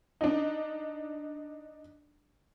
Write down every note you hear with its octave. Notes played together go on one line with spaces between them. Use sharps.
D4 D#4